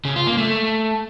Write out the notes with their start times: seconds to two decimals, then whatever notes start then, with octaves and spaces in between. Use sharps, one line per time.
0.05 C#3
0.16 F4
0.27 A#3
0.38 A3